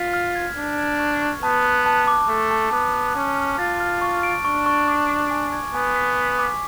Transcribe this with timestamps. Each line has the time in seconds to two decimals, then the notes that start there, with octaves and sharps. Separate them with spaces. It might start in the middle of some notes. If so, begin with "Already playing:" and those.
Already playing: F4 B6
0.14 F6
0.35 G#6
0.57 D4 G#6
0.79 G#6
0.99 C#6
1.21 C#6
1.43 B3 A5
1.65 F#6
1.86 A5
2.07 D6
2.29 A3 D6
2.51 A5
2.72 B3 D6
2.94 F#6
3.15 C#4 F6
3.37 F6
3.59 F4 A6
3.80 F6
4.02 C#6
4.23 D7
4.45 D4 C#6
4.66 C#6
4.88 D6
5.09 D6
5.31 G#5
5.52 G#6
5.74 B3 G#5
5.96 B6
6.17 B6
6.39 D6